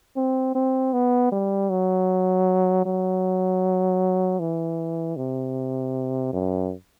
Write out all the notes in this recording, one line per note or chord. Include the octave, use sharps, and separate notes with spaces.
C4
C4
B3
G3
F#3
F#3
E3
C3
F#2